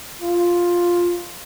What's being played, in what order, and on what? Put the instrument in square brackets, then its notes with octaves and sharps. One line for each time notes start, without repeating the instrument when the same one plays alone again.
[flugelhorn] F4